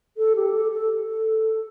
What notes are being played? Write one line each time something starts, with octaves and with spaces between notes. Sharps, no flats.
A4
G4
A4
A4
A4